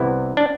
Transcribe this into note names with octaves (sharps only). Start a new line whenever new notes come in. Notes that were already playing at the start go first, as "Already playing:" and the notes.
Already playing: C2 C3 E3 B3 E4
D4